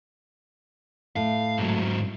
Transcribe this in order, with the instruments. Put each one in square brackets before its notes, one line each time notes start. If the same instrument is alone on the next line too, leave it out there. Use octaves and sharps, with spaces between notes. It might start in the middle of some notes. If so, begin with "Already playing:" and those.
[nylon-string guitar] A2 [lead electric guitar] F5
[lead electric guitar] G#2 F#3